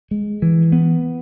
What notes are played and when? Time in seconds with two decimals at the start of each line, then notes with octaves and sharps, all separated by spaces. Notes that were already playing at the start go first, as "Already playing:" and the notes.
0.11 G#3
0.42 E3
0.72 B3